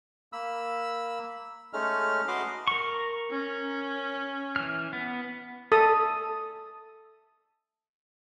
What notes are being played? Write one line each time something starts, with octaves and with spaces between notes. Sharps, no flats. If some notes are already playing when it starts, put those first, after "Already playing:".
A#3 B5 E6
G#3 A3 C#4 D#4 F6
F#4 B4 D#5 C6 D6
A#4 C#6
C#4
E3 F6
B3
A4 D#6